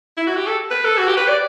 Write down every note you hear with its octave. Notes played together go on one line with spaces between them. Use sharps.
E4
F#4
G4
A4
B4
A4
F#4
G4
B4
D5